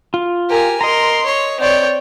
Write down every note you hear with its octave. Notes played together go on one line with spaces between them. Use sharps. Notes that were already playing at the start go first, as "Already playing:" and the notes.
F4
G4 A#4 G#5
A#4 D#5 A#5 C6
C#5
C4 C#5 D5 G5